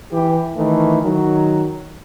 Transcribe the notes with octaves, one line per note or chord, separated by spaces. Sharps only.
E3 G4
D#3 E3 A3
D#3 F#3